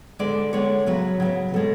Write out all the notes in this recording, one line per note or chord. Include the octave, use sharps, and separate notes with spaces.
D3 G#3 B3 D5
D3 G#3 B3 C#5
C#3 F#3 B3
C#3 F#3 B3
B2 G#3 B3 A4